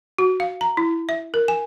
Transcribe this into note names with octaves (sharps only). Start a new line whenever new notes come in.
F#4
F5
A#5
E4
E5
A#4
G#5